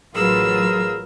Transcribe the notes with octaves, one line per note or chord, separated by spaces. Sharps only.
A1 F#3 F4 G#4 A#4 B4 E6